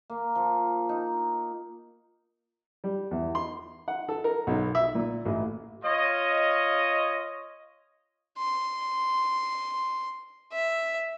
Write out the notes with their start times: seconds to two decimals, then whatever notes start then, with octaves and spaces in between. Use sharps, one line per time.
0.10 A#3
0.35 F3
0.89 D#4
2.84 G3
3.11 E2
3.35 C6
3.88 F#5
4.09 A4
4.24 A#4
4.47 B1
4.75 E5
4.95 A#2
5.25 A1
5.83 F4 C#5 D#5
8.38 C6
10.52 E5